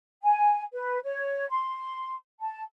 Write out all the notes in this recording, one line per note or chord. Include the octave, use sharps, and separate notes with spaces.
G#5
B4
C#5
C6
A5